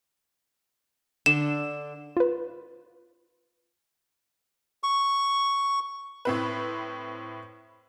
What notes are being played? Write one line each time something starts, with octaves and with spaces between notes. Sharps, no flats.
D3 E7
F4 B4
C#6
A2 C4 B4